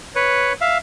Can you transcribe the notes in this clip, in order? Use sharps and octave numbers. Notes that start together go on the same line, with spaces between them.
B4 C#5
E5 F5